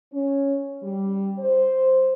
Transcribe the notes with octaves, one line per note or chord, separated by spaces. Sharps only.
C#4
G3
C5